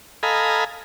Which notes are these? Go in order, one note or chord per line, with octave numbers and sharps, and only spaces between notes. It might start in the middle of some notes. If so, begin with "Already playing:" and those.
A4 D#5 F5 G#5 A#5 B5